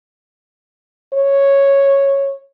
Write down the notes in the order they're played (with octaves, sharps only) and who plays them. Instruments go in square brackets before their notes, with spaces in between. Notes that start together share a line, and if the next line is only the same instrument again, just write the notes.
[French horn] C#5